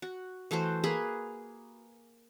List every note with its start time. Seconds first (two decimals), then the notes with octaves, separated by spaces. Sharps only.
0.02 F#4
0.51 E3 A3 F#4 C5
0.84 A#3 G#4 B4 B5